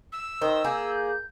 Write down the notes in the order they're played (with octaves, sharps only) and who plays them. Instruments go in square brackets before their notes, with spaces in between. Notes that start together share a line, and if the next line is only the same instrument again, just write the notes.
[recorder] E6
[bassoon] D#3 [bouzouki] C5 [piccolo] D#6
[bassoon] A#3 [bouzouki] G#4 [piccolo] G6